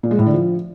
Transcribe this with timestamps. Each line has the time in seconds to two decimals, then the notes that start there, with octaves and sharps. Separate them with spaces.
0.03 A#2
0.11 G#3
0.19 A2
0.26 D3
0.34 F3